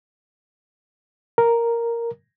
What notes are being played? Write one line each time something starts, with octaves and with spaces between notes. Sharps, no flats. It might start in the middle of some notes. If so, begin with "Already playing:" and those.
A#4